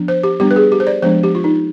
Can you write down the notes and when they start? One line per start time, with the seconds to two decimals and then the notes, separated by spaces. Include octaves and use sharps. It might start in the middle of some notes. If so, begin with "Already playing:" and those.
Already playing: F3 B3 D4
0.08 C5
0.23 G4
0.40 G3 B3 D4 G4
0.51 B4
0.56 G#4
0.72 G4
0.80 C5
0.87 D5
1.02 F3 G#3 B3 D4 C5
1.23 G4
1.35 F4
1.44 D#4